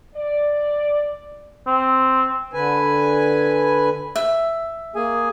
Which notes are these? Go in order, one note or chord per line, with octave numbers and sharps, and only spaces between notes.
D5
C4
D3 B4 G#5
E5
A#3 G#4 G#5